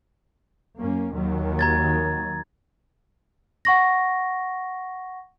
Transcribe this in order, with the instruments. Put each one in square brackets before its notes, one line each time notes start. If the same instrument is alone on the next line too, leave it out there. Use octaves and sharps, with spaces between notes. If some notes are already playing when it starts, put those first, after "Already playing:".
[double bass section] F#2 A#3 C#4
D#2 D#3 F#3
[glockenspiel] A#5 G#6 A6
[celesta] F#5 C#6 A#6